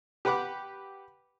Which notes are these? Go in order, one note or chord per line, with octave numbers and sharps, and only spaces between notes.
G4 B4 F#5 B5 D6 F#6